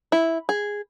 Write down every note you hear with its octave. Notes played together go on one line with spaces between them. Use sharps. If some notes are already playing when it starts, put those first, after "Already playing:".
E4
G#4